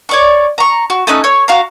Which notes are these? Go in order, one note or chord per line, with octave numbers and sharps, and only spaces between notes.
C#5 D5 C#6
A#5 C#6
F#4
A3 C#4 D#4 F#6
C#5
F#4 F5 A#5